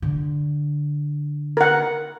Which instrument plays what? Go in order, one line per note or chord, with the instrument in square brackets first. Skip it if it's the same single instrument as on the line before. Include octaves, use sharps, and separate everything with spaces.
[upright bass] D3
[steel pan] A#4 F#5